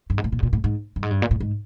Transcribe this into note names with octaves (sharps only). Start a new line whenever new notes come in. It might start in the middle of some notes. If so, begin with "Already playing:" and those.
G2
G#2
A2
A#2
A2
A#2
A2
G#2
G2
G#2
G2
A#2
A2
G#2